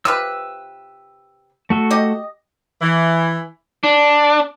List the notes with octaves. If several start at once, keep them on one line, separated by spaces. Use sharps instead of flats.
C3 F4 B4 E6
A3 F#4 A4
G4 D#5
E3
D4